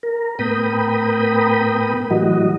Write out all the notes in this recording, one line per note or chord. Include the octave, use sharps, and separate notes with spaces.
A#4
A2 B3 A#4 G5 B5 D#6
A2 E3 F#3 G3 F#4 D#5